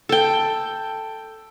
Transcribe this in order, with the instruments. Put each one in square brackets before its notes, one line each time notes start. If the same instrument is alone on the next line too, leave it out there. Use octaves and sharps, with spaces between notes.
[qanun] A4 G5